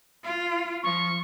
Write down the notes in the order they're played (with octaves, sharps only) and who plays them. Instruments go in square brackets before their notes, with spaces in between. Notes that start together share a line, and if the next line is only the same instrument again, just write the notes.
[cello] F4
[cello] F3 [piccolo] C#6